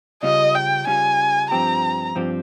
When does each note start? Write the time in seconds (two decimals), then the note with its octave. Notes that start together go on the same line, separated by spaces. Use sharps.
0.23 C#3 G3 C#4 F4 D#5
0.55 G5
0.87 C#3 G3 C#4 F4 G#5
1.51 G2 F3 C4 G4 A#5
2.15 G2 F3 C4 G4